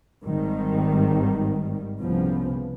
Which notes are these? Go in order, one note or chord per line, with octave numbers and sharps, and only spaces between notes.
G#1 G#2 D#3 G3
C2 C#3 F3 B3